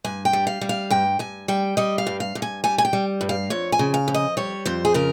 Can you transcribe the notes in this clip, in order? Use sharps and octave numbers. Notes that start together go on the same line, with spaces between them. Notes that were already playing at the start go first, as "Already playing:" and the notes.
G2 G#5
G5
G3
F5
G3
F5
G2 G5
G2 G#5
G3 G5
G3 D#5
F5
G2
F5
G2
G#5
G3 G#5
G#5
G5
G3
G2
F5
F2 C#5
G#5
C#3
F5
F2
D#5
G3 C#5
F2 C5
G#4
C#3 A#4